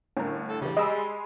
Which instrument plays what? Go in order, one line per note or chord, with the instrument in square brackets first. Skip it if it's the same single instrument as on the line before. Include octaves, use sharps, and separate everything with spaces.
[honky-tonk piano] G1 A2 D3 [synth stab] C#4 A#4
[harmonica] A4
[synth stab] C#3 E3 [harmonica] G3
[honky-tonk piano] G#3 G#5 B5 [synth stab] D#5 E6